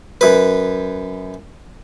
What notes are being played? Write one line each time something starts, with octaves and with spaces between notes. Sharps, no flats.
F#2 B4